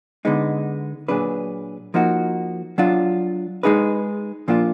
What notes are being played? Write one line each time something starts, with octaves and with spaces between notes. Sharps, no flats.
D3 G#3 B3 D#4
A#2 F#3 D4 G#4 B4
F3 A#3 D#4 F#4
F#3 D4 F4
G#3 D#4 G#4 B4
A#2 F3 A#3 D4 F4